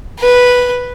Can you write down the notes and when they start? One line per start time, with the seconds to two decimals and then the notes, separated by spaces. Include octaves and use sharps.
0.19 B4